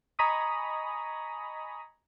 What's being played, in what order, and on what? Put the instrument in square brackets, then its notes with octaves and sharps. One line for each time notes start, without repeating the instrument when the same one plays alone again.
[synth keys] D#5 G#5 A#5 B5 C#6 D#6